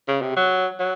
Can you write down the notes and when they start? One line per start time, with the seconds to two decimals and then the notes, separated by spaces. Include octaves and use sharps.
0.08 C#3
0.22 C3
0.37 F#3
0.80 F#3